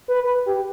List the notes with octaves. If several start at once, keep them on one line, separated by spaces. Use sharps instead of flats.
B4
G4